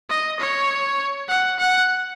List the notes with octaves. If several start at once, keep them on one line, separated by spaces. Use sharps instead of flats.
D#5
C#5
F#5
F#5